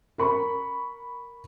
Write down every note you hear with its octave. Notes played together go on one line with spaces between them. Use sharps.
A#4 B5 C#6